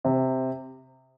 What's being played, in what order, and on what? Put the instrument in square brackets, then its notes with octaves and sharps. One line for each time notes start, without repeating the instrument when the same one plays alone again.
[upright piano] C3